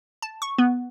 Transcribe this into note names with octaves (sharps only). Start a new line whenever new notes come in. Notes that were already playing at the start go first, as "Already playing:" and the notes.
A5
C#6
B3